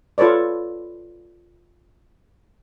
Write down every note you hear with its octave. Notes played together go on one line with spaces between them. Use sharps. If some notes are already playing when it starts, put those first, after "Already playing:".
F4 A4 B4 C#5 D5